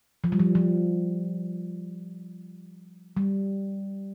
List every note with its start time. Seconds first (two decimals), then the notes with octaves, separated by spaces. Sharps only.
0.24 F3
0.32 G3
0.39 F3
0.55 F3
3.17 G3